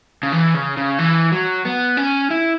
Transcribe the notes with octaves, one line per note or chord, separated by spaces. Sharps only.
C#3
E3
C#3
C#3
E3
F#3
B3
C#4
E4